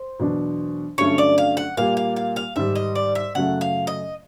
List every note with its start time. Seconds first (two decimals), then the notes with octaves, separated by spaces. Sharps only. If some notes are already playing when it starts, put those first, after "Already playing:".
Already playing: C5
0.19 E2 B2 F#3 B3 D4
0.98 G2 D3 F#3 A3 C#4 C#5
1.18 D5
1.38 F5
1.57 F#5
1.77 A#2 G3 A#3 F5
1.97 F5
2.16 F5
2.36 F5
2.56 G#2 D#3 G3 E5
2.75 D#5
2.95 D5
3.15 E5
3.35 F#2 C#3 F#3 A3 F#5
3.61 F5
3.87 D#5